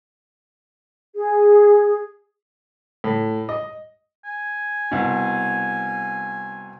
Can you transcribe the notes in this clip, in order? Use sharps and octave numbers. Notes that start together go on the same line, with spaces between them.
G#4
A2
D#5
G#5
C2 B2